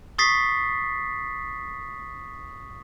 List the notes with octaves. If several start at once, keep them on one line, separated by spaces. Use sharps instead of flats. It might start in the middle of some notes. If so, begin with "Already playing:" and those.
C#6 D#6 A6 B6 C7